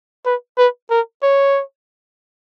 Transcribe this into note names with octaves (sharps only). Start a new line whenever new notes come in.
B4
B4
A#4
C#5